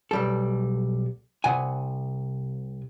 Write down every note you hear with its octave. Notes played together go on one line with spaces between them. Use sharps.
B1 G3 A4
C2 C3 F#5 G#5